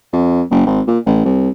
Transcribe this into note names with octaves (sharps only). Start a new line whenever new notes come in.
F2
F#1
G#1
A#2
A1
C2